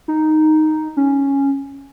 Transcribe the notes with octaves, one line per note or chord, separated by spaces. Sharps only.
D#4
C#4